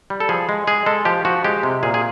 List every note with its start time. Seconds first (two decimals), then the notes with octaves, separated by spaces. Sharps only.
0.10 G3
0.20 A4
0.29 F3 G#4
0.49 G#3
0.67 G#3 G#4
0.86 G#3 A4
1.05 F3 G4
1.25 F3 F#4
1.44 G#3 G4
1.63 C3
1.83 A#2 G#4
1.94 G#4